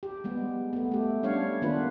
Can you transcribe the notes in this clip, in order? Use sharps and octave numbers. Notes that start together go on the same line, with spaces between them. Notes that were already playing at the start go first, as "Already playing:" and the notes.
G4
G3 G#3 B3
A3 B3
A3 G4
G3 C#4 D4 C#5 F5
D#3 A#3 B3 D4 F4 B4